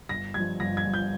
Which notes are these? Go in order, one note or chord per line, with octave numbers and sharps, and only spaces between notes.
G1 A#6
G2 F3 G#6
G1 A#6
G#6
G2 F3
G6